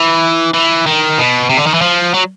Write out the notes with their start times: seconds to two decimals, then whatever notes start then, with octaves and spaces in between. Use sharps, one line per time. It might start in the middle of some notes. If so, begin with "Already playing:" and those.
Already playing: E3
0.54 E3
0.86 D#3
1.18 B2
1.49 C3
1.57 D3
1.67 D#3
1.74 E3
1.81 F3
2.14 F#3